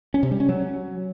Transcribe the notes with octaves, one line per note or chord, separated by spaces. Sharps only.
C#4
C3
G3
C#4
F#3